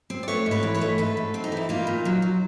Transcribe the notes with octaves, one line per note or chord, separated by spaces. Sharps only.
C4
D5
A3 B4 C#5
G#2
B4 C#5
E3
B4 C#5
A3
G#2 A4 B4
G#2
C4
D#4
E3 E4
A#3 D#4 F4
A#2
F#3
F#3